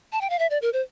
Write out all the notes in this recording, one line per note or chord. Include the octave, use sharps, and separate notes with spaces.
A5
G5
F5
E5
D5
A#4
C5